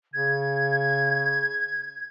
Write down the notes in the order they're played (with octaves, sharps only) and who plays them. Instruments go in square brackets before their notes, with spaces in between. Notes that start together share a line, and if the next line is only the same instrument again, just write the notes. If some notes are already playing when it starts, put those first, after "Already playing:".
[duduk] C#3 [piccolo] G#6